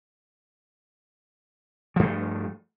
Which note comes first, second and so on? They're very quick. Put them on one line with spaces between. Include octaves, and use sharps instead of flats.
F3 G2 A3